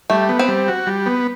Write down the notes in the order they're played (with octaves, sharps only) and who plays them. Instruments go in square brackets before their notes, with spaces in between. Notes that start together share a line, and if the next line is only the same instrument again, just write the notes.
[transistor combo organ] G3 [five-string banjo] A3
[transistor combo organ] B3
[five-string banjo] C4
[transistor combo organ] G3
F#4
G3
B3